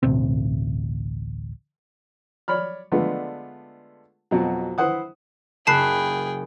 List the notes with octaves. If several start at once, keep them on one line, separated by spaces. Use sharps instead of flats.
A1 D2 B2 C4
C#5 D5 B5 F6
D3 G#3 A3 B3 D4 F4
F2 B2 F#3
E4 B4 C5 F#5 D#6
F#1 G#4 G5 A5 B5 F#6 C7